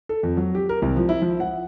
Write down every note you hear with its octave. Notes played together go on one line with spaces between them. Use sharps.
A4
F2
F#3
G4
A#4
C2
F3
E4
F3
F#5